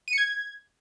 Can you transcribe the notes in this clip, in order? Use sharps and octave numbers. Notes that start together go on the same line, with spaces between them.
D#7
C#7
G#6